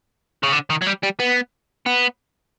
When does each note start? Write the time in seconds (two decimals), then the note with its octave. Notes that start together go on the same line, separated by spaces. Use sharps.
0.43 C#3
0.53 D3
0.70 D#3
0.82 F#3
0.87 G3
1.03 G3
1.20 B3
1.86 B3